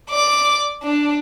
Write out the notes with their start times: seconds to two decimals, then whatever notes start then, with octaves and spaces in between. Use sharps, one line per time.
0.10 D5 D6
0.83 D4